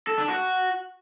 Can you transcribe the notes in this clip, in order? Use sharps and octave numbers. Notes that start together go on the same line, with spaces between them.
A4
D4
F#4